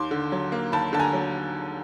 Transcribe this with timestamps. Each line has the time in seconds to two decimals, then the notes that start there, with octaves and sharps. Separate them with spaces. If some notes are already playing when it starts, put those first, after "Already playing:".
Already playing: D#2 C6 D6
0.11 D3
0.32 F#3
0.52 A#3
0.72 D#2 A5 B5
0.93 D3 A5
1.00 G#5 A#5
1.13 F#3